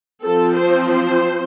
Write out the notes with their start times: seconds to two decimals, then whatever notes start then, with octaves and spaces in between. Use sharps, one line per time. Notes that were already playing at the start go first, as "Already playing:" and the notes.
0.23 F3 C4 A4
0.57 C5
0.90 C5